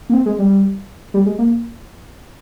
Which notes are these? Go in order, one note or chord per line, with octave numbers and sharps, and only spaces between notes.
A#3
C4
G#3
G3
G3
G#3
A#3